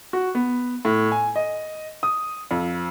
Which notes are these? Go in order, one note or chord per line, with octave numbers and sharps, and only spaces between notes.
F#4
B3
A2
G#5
D#5
D#6
F2